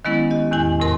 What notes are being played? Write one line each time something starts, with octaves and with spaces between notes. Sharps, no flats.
D#3 F#3 G#3 B3 C#4 E4
G4 D#5
E2 A2 D#3 E4 G#5
F2 A2 C3 A#4 C6